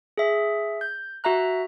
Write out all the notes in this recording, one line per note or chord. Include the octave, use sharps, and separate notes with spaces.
G#4 E5
G6
F#4 E5 A#5 F#6